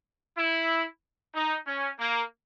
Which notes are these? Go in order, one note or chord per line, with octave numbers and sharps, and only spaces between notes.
E4
D#4
C#4
A#3